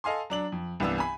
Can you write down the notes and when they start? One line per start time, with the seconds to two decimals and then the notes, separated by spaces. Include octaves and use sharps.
0.04 A4 D#5 F5 G#5 C6
0.30 F#3 D4 F#7
0.52 F2
0.80 C2 G2 E3 B3 D4 E6
0.98 G#5 B5